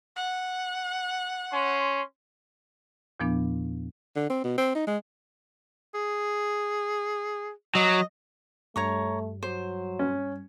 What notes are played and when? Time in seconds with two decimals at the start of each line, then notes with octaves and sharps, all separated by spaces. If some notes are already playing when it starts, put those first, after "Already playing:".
0.16 F#5
1.52 C#4 C6
3.20 E2 A#2 F3 B3 D4
4.16 D3
4.30 C4
4.44 B2
4.57 C4
4.75 D#4
4.87 G#3
5.95 G#4
7.75 F#3 D#5
8.76 G2 G3 A3 C#5 A#5 C#6
9.43 F#3 C5
9.99 C#4